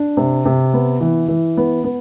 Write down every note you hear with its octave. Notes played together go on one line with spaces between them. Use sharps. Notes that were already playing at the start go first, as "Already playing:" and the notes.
Already playing: D4
C3
C3
B3
E3
E3
B3
B3